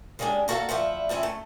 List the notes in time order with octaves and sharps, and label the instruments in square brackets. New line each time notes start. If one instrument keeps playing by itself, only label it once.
[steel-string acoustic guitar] C#3 G3 G#3 A#3 D4
A#3 F#4 A4 C5 F5 F#5
D2 F3 E4 F#5
F3 A3 C4 C#4 E4
A3